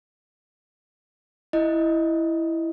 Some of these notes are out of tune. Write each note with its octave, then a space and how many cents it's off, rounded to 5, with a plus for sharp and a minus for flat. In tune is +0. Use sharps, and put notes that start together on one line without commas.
E4 +0 D#5 +0